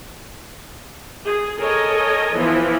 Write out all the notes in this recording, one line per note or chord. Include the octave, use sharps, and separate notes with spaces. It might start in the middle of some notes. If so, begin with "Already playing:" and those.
G#4
A4 A#4 C#5 D#5 G#5
E3 F3 B3 E4